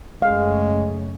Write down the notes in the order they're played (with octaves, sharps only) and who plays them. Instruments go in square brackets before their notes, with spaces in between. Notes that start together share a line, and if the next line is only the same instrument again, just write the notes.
[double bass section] F#1 A3 C#4 [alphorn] G#3 [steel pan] F5